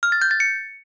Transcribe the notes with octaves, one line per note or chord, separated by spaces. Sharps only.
F6
A6
G6
A6
C#7